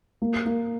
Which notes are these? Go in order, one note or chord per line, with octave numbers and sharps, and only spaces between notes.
A#3
A#3